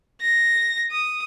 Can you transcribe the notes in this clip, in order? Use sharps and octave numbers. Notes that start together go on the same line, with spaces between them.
A#6
D#6